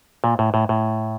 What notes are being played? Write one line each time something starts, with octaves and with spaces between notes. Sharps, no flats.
A#2
A2
A2
A2